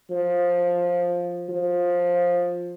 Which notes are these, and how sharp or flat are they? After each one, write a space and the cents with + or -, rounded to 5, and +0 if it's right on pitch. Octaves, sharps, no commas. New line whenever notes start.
F3 +10
F3 +15